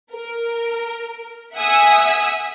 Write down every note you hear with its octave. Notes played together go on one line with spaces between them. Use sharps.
A#4
E5 F#5 G#5 D#6 E6